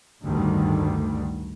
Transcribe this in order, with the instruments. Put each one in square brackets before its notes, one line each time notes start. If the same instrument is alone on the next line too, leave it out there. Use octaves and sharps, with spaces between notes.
[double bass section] A1 D2 G2 D3 D#3 G3